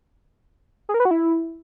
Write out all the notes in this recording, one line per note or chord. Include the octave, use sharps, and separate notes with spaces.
G#4
A#4
B4
F#4
E4